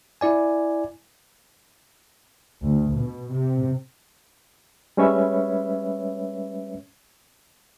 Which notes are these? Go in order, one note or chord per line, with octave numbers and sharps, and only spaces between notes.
E4 D5 G#5
D2
B2
C3
G3 G#3 C#4 B4 C#5 E5